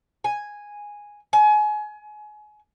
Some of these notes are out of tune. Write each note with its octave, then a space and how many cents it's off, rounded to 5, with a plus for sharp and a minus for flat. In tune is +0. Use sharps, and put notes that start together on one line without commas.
G#5 -5
G#5 +30